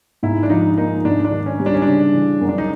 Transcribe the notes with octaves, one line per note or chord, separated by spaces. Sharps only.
G#2 E4
D4
F3 D#4
A#3 D#4
G#2 D4
D4
D#3
C#4
G3
D4
C#4
C#3 D4
E3
F#2
D4
D#4